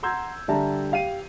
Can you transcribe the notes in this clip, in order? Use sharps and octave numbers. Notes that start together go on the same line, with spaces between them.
F#5 A#5 C6 E6 G6 G#6
D3 G3 E5 A5 A#5
G4 F5 C7 D#7